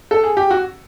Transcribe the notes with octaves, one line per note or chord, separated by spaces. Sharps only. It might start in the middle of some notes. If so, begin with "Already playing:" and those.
A4
G#4
G4
F#4